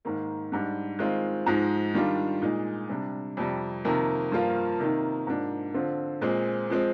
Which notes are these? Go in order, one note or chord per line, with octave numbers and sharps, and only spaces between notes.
G#2 D#3 A#3
G#2 G3 D4
D#3 G#3 C4 F4
G#2 F3 G#3 D#4
D#3 G3 D4 F4
A#2 G#3 D#4
C3 G3 D4
F2 C3 G3
F2 C3 D#3 A#3
G2 F3 A#3 F4
C3 D#3 A#3 D#4
G#2 F3 A#3 D4
D3 F3 C4 F4
A#2 G#3 C4
F3 G#3 C4